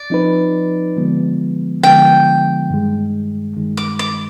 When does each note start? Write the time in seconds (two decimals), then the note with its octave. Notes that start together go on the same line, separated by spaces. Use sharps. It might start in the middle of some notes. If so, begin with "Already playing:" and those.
Already playing: D5
0.10 F3 C4 D#4 B4
0.96 D3 F3 G#3 B3
1.83 D3 F3 G#3 B3 G5
2.70 G2 D#3 G#3
3.57 G2 D#3 G#3
3.77 D6
3.99 D6